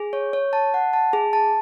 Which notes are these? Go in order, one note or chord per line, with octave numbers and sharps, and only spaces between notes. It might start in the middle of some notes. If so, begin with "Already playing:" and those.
Already playing: G#4
C#5
C#5
A5
F#5
A5
G#4
A5